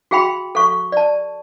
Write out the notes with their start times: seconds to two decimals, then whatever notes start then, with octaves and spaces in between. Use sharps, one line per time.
0.11 F#4 G#4 F5 G5 B5 C6
0.55 A4 F5 C#6
0.92 D5 A5